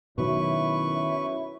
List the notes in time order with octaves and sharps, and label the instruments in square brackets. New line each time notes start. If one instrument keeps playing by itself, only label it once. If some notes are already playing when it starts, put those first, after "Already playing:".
[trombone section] F#2 E4 [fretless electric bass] B2 D#3 F#3 [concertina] B4 C#6